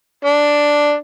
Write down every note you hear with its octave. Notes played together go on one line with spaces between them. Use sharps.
D4